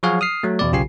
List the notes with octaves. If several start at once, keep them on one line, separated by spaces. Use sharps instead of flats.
F3 F#3 F#4 G#4 C#5 F5
D#6 F6 C7
F#3 A3
E2 B2 D5
B1 C#3 F4 G4 G#5 C7